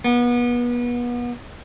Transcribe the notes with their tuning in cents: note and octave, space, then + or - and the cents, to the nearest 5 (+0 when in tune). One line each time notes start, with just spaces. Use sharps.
B3 -30